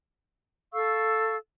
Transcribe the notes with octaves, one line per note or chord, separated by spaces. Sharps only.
A4 F5 C#6 E6